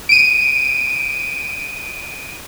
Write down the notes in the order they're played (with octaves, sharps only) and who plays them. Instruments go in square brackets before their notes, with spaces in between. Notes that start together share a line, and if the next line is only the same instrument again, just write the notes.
[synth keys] D7 D#7